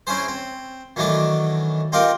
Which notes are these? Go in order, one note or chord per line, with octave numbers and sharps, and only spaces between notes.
C4 C#4 E4 G#4 C5
C4
D#3 E3 F#3 A3 D4 A4
C4 D#4 F4 G4 A#4